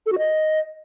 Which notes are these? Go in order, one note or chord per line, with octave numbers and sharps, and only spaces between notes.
A4
F#4
D#5